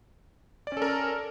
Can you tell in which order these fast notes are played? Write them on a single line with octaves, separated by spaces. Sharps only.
D5 C#4 A4 A#4